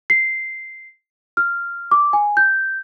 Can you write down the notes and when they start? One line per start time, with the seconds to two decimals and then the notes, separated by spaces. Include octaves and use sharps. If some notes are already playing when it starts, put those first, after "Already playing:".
0.10 C7
1.37 F6
1.91 D6
2.13 G#5
2.37 G6